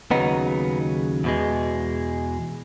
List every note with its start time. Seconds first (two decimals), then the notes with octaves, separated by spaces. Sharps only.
0.11 D#2 C#3 F#3 B3 D#4
1.24 E2 B2 G#3